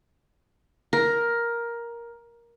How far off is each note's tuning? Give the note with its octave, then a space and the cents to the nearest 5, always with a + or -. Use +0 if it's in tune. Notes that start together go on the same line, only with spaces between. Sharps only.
A#4 +10